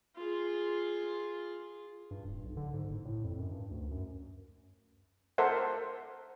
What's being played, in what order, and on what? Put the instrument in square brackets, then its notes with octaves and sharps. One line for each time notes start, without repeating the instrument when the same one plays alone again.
[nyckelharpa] F4 G#4
[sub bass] G2
D1
B1
D3
G#2
F#1
A2
F2
F#2
G2
D2
F#2
[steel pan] A4 A#4 C5 E5 F#5